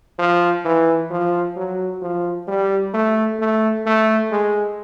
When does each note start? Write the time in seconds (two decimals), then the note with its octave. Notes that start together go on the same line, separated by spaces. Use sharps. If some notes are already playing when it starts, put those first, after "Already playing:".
0.19 F3
0.65 E3
1.11 F3
1.56 F#3
2.02 F3
2.48 G3
2.94 A3
3.40 A3
3.86 A3
4.31 G#3